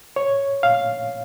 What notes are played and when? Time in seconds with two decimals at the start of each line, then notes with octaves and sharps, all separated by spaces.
0.16 C#5
0.63 F5